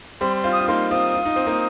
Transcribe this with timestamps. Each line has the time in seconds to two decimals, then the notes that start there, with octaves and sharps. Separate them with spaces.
0.21 G3 C4 C6
0.36 C6
0.44 C4 F4
0.52 D#6
0.60 F4
0.68 A#3 D#4 C6
0.91 C4 F4 D#6
1.15 F4
1.25 D#4
1.36 C4
1.46 A#3 D#4